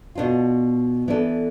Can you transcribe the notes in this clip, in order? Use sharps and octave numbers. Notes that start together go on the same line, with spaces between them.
B2 B3 D4 F4
E3 B3 D4 A4 D5